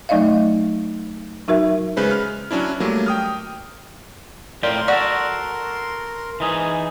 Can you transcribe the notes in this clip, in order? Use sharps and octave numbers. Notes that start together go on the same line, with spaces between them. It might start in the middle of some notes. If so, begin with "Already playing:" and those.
F#3 A3 D#4 D5 D#5 F5
F#3 D#4 F#4 A#4 E5
C#3 G#3 B4 C5
F6
F#3 C#4 D4 E4
F#3 G3 A3 A#3
G5 D#6 F6
A2 F4 A#4 D5 G5 C6
F#4 A4 D5 F#5
E3 D#4 G#4